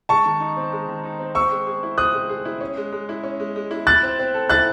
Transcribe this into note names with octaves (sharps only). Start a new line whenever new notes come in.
G#3 A5 C#6
D#3
D#4
C4
G#3
D#3
D#4
C4
C4 C#6 E6
G#3
G#4
E4
C4 D#6 F#6
G#3
G#4
E4
C#4
G#3
G#3
E4
C#4
G#3
G#3
E4
E4 F#6 A6
C4
C4
A4
E4 F#6 A6